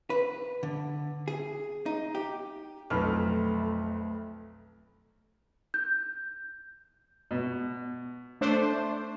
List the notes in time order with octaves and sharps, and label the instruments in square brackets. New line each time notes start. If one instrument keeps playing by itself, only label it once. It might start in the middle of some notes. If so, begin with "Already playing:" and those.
[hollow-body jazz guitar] B4
D3
G#4
D#4
G4
[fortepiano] B1 [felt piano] F2 B5 F6 [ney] A3
[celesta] G6
[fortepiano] B2
[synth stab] A3 D4 C5